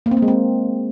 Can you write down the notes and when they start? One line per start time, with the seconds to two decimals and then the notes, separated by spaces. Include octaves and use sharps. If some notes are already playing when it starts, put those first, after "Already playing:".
0.06 A#3
0.11 C4
0.17 A#3
0.22 G#3
0.28 C4